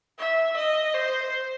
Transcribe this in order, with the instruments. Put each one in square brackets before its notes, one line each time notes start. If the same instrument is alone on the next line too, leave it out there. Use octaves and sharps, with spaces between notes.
[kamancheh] E5
D#5
C5